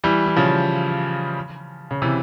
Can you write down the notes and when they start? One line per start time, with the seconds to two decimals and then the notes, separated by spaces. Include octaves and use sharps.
0.04 E3 G3
0.26 E3
0.37 C#3 F3
1.91 C#3
2.02 C3 E3